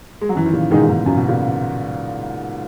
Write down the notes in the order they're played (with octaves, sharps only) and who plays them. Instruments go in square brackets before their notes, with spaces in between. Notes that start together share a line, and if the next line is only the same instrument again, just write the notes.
[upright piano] G#3
F#3
[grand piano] F#2 [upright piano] E3
[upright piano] D#3
A#2 C#3
[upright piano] G#2 B2 [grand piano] D#3 G#3 D#4 G#4
[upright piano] A#2
G#2 B2
[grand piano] F#2 [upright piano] C#3
[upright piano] B2
A#2 C#3